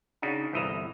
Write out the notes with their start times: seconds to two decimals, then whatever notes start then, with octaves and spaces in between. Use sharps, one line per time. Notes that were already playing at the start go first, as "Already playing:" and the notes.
0.22 C#3 D4 D#4 F#4
0.53 G1 C2 E3 D#5 E5 A#5